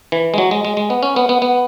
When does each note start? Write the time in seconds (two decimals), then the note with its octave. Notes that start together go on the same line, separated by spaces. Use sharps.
0.12 E3
0.34 G#3
0.38 F#3
0.51 G#3
0.65 G#3
0.77 G#3
0.90 B3
1.03 C#4
1.16 B3
1.29 B3
1.42 B3